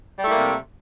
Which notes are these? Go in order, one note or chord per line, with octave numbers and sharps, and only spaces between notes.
C3 G3 A3 A#3 E4